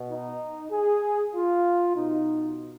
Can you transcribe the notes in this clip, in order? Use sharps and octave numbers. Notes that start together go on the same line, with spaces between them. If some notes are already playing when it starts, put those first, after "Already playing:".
Already playing: B2
D#4
G#4
F4
B2 D#4